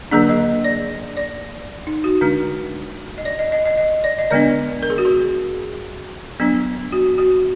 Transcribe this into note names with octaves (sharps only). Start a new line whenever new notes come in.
D3 F#3 A#3 D4 G#4
D#5
D5
D5
D#4
F#4
D3 G#3 D4
D#5
D5
D#5
D#5
D#5
D#5
D5
D#5
D3 G#3 B3 D4 D5
A#4
G#4
F#4
G#4
F#3 B3 D4
F#4
F#4